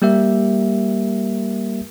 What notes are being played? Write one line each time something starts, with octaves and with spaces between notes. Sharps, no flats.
G3 A#3 G4 A#4 E5